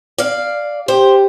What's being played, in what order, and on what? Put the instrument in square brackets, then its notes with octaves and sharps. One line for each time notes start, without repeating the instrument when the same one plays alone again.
[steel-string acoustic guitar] D5 F5
[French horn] G4 [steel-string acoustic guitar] C5